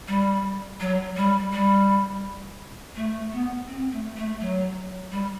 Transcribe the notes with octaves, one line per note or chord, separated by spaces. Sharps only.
G3
F#3
G3
G3
A3
B3
C4
A3
A3
F#3
G3